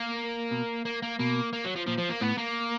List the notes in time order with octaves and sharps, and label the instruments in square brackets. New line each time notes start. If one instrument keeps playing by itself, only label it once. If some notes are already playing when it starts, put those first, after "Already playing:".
Already playing: [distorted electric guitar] A#3
[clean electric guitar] B2
[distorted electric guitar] A#3
A#3
[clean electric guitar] B2 [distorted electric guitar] A#3
[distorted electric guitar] A#3
F#3
F3
[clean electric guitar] A#2 [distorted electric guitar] F3
[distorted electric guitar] F3
A#3
[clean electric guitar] A2 [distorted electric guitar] B3
[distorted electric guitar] A#3